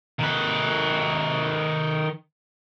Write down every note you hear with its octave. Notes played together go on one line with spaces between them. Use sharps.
D#3 B4